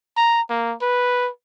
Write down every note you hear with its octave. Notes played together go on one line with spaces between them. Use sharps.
A#5
A#3
B4